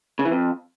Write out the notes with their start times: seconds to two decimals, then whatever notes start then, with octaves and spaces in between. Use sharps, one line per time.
0.19 C#3
0.25 E3
0.31 F2